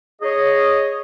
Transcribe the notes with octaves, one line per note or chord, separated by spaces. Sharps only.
G#4 C#5 D#5